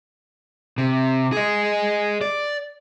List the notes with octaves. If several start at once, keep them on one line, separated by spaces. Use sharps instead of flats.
C3
G#4 D#5
D5